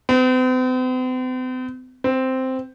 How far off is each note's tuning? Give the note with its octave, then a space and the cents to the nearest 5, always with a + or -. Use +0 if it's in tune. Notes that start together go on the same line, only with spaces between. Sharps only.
C4 -45
C4 -5